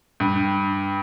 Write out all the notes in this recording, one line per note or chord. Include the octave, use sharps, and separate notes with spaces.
G2